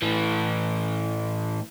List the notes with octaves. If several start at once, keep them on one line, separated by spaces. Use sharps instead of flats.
A2 E3